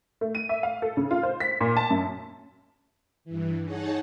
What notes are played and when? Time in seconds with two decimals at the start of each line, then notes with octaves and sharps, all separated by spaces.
0.21 A3
0.35 D#7
0.49 E5
0.63 F5
0.82 A4
0.97 C#3
1.11 F4
1.23 C5
1.40 B6
1.61 A#2
1.77 A5
1.90 F#2
3.25 G2 E3
3.64 D#4 G#4 C#5 F#5 A5